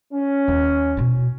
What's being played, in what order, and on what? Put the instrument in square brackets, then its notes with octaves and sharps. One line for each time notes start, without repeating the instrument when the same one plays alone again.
[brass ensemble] C#4
[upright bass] D#2
B2 E4